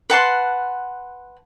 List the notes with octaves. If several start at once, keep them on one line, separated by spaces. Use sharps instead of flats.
B4 F#5 A5 C6